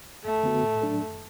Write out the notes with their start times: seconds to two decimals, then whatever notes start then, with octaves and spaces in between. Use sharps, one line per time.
0.24 F#2 A3
0.43 D3 B3 F#4
0.63 A2
0.82 F#3 D4 A4
1.01 F#2